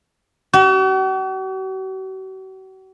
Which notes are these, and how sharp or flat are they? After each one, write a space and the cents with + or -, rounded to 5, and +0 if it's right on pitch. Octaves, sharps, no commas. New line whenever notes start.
F#4 +45